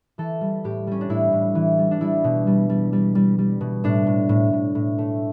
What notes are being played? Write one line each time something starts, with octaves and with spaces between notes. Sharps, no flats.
E3 A4
G3
A2 G4
G3 C#4
D4
A2 E4
A2
E3
G3
D4
G3 E4
B2
G3
G3
G3
G3
G3
B2
A2 D4
A2
A2
A2
A2
A3